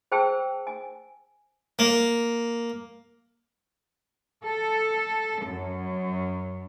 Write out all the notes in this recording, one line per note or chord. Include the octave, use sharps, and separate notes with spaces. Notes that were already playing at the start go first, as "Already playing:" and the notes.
G#4 C5 G5 A5 E6
G#5
A#3
A4
F#2